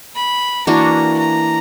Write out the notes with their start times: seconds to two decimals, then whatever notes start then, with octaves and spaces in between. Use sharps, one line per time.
0.16 B5
0.67 E3 A#3 D4 F#4 A#5
1.19 A#5